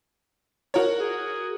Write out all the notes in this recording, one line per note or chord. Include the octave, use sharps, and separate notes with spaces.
F#4 A#4 C#5
G#4